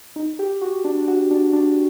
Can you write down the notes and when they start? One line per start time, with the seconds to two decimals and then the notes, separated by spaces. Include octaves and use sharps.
0.16 D#4
0.39 G4
0.61 F#4
0.84 D4
1.08 F#4
1.31 D4
1.53 D4